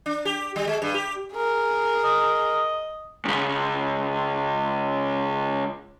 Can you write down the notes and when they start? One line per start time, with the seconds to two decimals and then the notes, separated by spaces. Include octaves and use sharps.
0.06 D4
0.25 G4
0.56 G3
0.67 G#3
0.82 G2
0.94 G4
1.33 G#4 A#4
2.04 D#5
3.25 C#2 G2